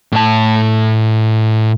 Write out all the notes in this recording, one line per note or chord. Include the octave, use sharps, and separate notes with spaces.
A2 A5